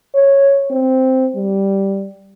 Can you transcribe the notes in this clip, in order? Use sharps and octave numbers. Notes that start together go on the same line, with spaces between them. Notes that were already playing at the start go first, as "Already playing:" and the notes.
C#5
C4
G3